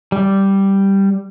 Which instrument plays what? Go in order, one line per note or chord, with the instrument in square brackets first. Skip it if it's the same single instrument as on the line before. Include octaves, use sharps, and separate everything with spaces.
[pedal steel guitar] G3